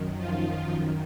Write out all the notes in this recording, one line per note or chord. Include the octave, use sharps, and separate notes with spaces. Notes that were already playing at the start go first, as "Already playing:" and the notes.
Already playing: F#2 D#3
F3 F4